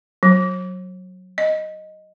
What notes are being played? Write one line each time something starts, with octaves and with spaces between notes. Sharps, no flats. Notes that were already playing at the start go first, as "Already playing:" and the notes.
F#3
D#5